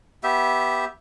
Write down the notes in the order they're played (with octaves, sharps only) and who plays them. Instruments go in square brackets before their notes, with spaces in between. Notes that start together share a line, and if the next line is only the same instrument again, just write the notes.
[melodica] B3 G4 E5